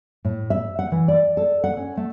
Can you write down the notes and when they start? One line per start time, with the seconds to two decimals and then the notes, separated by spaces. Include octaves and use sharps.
0.25 A2
0.50 E5
0.79 F#5
0.92 E3
1.08 D5
1.37 A4
1.64 F#5
1.77 C#4
1.97 A3